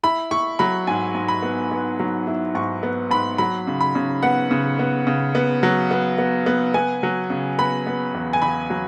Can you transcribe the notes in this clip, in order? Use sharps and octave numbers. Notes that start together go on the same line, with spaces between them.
E4 B5
E4 C#6
F#3 B5
G#2 G#5
G#2
B5
B3
B3
F#3
E4
G#2 C#6
B3
G#2 B5
F#3 B5
C#3
B5
C#3
B3 F#5
C#3
B3
C#3
B3
F#3
B3
B3
B3
B3 G#5
F#3
C#3
B3 B5
B3
E2
G#5
E2 B5
F#3